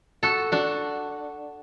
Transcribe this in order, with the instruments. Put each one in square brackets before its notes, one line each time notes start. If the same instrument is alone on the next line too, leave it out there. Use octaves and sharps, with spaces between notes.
[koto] F#4 A4
D4 F#4